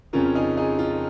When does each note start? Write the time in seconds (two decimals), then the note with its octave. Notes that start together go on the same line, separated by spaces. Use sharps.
0.13 F2 C#3 F3 C#4 F4 A#4
0.35 D#4 G#4
0.57 D#4 G#4
0.79 F4